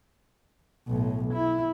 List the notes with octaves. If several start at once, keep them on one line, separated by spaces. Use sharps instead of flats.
B1 A2
E4